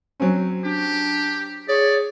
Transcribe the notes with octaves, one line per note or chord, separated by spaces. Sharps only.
F#3 C4 C#4
D4 G4
G#4 C#5 D5